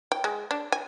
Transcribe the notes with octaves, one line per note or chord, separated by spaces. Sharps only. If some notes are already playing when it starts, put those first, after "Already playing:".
G5
G#3
D4
G#5